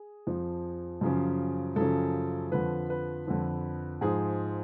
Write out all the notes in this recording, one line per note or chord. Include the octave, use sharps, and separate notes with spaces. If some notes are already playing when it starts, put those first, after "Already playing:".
Already playing: G#4
F2 F3
F#2 C#3 F3
F#2 C#3 F3 A4
F2 D3 F3 B4
B4
F2 D3 F3
G#2 F3 G#4